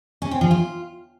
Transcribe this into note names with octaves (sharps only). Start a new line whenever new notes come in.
C#4
C4
F3
F4